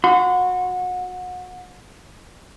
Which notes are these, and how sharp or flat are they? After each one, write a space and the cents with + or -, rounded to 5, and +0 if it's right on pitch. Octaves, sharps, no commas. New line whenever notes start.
F#4 -25 C6 -45